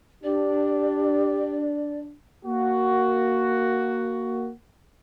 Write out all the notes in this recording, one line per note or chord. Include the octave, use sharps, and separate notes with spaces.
D4 G4 D5
A#3 F#4